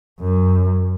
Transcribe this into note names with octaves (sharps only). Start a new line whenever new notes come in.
F#2